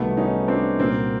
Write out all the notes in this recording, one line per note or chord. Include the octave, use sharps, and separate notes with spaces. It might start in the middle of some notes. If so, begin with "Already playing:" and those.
Already playing: C2 C3 D#3 F#3 A3 B3
C#4 D#4
C4 D4
C2 A#2 F#3 A#3 C4